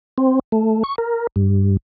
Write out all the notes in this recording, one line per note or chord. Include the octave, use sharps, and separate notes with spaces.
C4
A3
C#6
A#4
G2